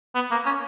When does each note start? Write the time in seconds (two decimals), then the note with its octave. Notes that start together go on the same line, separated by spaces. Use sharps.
0.15 B3
0.31 A#3
0.46 C#4